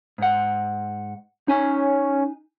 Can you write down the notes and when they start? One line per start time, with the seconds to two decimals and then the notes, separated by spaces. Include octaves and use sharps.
0.18 G#2 F#5
1.48 C#4 D#4 G#5